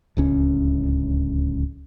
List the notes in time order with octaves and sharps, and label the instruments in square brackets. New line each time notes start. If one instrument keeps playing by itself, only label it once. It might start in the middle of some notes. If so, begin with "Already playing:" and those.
[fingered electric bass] D1 C#2 C#4